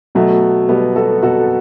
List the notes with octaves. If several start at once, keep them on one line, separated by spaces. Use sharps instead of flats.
B2 F#3 A3
B2 G3 B3
F#4 A4
B2 F#4 A4